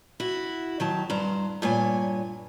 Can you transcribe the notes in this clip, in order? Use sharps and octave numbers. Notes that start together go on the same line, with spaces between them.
E4 F#4
D#3 F#3 A5
G2 C5 A#5
G2 A#2 C#5 G#5